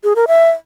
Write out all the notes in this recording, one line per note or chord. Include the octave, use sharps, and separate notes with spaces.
G#4
A#4
E5